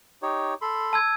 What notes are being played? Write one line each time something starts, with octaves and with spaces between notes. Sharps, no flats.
D#4 G4 C#5
A4 B5 C6
A5 E6 G#6